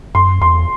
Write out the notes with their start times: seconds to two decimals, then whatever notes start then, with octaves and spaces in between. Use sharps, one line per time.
0.15 F#2 C6
0.41 E2 C6